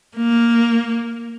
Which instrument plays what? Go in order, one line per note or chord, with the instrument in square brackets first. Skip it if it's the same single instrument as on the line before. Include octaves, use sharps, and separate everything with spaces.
[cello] A#3